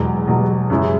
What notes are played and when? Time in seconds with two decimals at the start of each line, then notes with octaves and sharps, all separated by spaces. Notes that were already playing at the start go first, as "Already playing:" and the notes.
Already playing: E1 E2 B2 F#3
0.27 E1 E2 B2 F#3
0.70 F#2 C#3 E3 G#3 E4